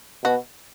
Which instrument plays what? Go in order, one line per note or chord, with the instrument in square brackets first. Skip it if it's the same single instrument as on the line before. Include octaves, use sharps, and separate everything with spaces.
[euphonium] B2 [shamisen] F#4